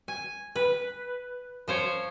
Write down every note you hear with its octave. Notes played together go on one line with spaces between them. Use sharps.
G#5
B4
F3 C5 C#5